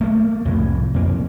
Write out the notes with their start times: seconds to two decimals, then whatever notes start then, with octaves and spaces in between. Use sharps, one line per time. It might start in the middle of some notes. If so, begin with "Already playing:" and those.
0.01 A3 A#3
0.45 C2 F2 A2
0.94 F2 A#3